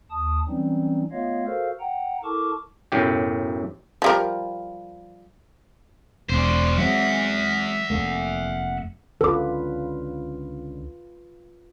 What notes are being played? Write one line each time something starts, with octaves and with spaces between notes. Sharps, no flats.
D#2 A5 D#6
E3 F#3 G3 C4 C#4 D#4
A3 B3 F4 C#5 D#5 F5
F#4 A4 A#4 C5 F5
F#5 G5 A#5
E4 A4 A#4 A5 C#6 D6
B1 F#2 A2 G4
F3 G3 A#4
E1 D4 C5
F#3 G#3 C4 E5 F#5
F1 A3 A#3
C#2 D3 F4 A4 B4 D6